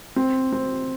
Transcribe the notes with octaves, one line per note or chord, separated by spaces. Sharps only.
C4
C4